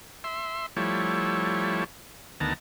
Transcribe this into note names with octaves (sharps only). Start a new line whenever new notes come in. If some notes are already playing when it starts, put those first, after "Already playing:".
E5 C6
F3 G3 A3 E4 C#5
D2 D#3 B3 A5 A#5